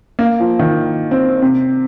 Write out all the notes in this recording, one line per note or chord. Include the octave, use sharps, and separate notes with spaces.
A#3
F3
D#3
C4
C3